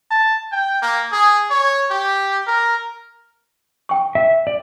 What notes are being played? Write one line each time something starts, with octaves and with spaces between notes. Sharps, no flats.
A5
G5
A#3
G#4
C#5
G4
A#4
G5 C#6
E5
D5